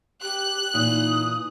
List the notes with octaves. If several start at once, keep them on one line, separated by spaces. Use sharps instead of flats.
G4 F#6
A#2 E3 D#4 D#6